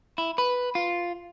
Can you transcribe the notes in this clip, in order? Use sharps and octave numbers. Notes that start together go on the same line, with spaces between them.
E4
B4
F4